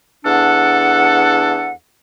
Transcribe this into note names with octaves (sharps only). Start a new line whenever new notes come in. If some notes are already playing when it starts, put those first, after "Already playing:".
E2 D4 A4 F#5